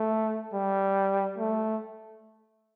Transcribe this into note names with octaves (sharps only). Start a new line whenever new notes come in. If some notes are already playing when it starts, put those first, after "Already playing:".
Already playing: A3
G3
A3